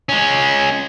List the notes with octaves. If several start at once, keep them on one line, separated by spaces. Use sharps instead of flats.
G#3 C#4